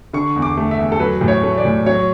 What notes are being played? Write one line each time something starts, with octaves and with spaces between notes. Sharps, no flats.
D3 C#6
E2
D6
A3
E5
E2
A4
F#3 B4
A2
C#5
A3
D5
A2
F#3 C#5